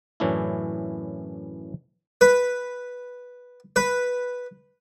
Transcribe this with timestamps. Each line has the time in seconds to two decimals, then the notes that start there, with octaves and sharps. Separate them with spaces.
0.20 F#2 A2 E3 C#4 D4 E4
2.21 B4
3.76 B4